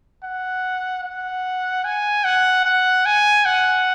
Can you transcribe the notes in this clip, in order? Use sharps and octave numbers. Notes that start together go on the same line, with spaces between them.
F#5
F#5
G#5
F#5
F#5
G#5
F#5